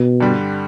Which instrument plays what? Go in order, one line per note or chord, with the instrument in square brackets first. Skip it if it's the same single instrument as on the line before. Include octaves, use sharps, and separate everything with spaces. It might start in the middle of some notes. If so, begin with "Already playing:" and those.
Already playing: [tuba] B2
[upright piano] G2 D3 G3